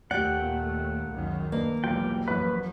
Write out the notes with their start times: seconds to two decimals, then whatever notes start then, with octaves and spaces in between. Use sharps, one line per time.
0.11 D#2 A3 G4 D5 F#5 G5
0.42 A#2
1.11 C#2 F#2 D#3
1.52 A#3 D4 B4 D#5
1.84 E1 B1 E3 G3 F4 G5
2.28 A1 F#2 F3 B4